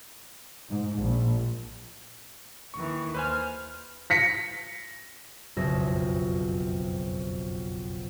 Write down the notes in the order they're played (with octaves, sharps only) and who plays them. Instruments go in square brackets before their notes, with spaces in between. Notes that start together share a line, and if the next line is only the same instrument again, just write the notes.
[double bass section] G#2
A#1
[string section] D#2 D#3 E3 [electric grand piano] C#6
[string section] D#2 F6 [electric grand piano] B4 C5 G#5
[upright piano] A#6 B6 C#7
[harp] F#1 B1 F2 G#4 E5 A#6